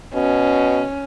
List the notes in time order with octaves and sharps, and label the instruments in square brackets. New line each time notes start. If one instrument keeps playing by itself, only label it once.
[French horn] B2 [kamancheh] C#4